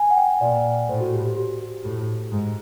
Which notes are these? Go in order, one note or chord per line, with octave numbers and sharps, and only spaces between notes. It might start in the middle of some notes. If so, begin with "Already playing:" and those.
Already playing: G#5
F#5
G5
A#2 D5
A2 C5
F#4
G4
G4
G4
G4
A2
G#2